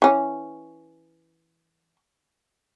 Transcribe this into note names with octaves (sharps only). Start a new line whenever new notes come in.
E3 C#4